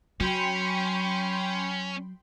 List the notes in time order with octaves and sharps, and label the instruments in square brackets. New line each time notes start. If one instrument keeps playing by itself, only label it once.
[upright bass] F#3 [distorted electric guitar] C#4 [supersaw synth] G5 B5 C6